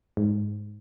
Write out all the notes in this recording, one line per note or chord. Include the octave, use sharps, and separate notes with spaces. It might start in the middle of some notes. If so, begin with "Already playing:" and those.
G#2